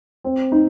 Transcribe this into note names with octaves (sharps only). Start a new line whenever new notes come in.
C4
D#4